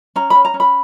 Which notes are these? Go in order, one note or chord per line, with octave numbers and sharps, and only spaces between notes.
C#4 A#5
C#4 B5
A#5
C#4
B5